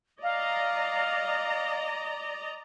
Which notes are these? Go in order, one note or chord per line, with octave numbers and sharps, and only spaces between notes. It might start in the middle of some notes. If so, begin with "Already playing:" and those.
D5 D#5 F5 A#5